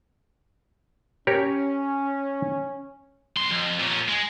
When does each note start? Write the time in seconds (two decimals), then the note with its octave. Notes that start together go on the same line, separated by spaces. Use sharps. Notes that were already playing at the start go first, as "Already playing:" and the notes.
1.27 C#4 G4 A#4 C#5
3.37 B1 C6
3.51 F2
3.79 A#2 C#4
4.08 G#3